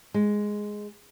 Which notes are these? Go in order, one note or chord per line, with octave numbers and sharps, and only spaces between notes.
G#3